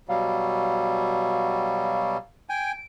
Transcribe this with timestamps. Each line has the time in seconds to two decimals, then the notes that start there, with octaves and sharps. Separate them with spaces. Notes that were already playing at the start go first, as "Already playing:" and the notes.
0.09 B2 F#3 G3 F5
2.49 G5 G#5 D7